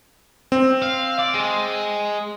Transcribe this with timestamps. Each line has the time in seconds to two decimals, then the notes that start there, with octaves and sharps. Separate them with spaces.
0.52 C4
0.82 F5
1.19 D5
1.34 G#3